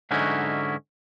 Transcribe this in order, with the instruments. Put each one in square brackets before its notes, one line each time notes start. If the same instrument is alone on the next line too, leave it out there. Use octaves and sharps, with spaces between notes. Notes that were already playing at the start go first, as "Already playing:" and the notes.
[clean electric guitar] G#2 D3 F#3 C#4 D#4 E4